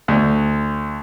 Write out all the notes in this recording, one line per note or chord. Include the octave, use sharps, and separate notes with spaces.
D2